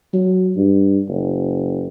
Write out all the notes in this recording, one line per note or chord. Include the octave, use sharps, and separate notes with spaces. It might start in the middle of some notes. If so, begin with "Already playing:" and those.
F#3
G2
F#1